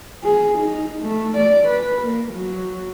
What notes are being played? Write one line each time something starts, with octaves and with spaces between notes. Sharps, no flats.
G#4
D#4
A3
D5
B4
A#3
F#3